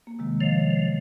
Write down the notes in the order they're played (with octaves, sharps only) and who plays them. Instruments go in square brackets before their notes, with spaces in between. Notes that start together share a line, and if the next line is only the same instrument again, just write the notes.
[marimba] A#3
C3 D#3 G#3
[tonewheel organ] F3 [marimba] C#5 D#5 F5